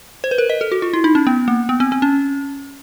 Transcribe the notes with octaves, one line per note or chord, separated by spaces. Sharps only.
C5
B4
A#4
D#5
A4
F#4
F4
E4
D#4
C#4
B3
A#3
B3
C4
C4
C#4